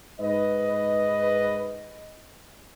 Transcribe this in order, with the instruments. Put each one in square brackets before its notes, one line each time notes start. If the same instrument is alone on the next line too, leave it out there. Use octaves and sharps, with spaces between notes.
[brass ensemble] G#2 B4 D#5